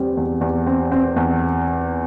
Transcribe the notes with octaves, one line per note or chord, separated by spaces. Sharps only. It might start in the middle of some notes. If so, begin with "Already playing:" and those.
Already playing: E2 G3 C4
E2
E2
C4
C4
E2